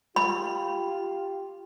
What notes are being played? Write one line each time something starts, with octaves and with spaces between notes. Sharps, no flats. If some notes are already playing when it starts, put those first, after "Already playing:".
F4 G4 B5